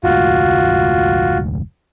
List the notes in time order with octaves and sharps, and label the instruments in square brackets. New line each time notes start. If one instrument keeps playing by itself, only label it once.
[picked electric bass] F1 D2 G#2 [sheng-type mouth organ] F4 F#4